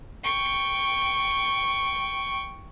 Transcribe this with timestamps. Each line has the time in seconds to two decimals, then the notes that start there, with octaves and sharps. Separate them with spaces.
0.24 G5 C#6